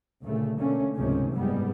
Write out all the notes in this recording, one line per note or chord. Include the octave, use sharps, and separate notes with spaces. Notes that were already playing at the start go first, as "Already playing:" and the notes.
D2 A#2 C#3 A3
B2 D3 A3 A#3 C#4
C#2 G#2 C3 D#3 F3 C#4
F#1 G#2 G3 G#3 B3